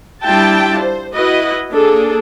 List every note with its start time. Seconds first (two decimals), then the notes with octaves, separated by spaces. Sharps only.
0.24 G3 D4 E4 F4 G5 A5
0.80 C5
1.14 E4 F#4 B4 D#5
1.71 A#3 D4 G#4 A4